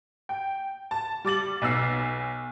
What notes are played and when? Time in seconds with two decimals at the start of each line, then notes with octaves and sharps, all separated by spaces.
0.29 G5
0.91 A5
1.24 G3 D6 A6 F#7
1.62 B1 B3 E6 C7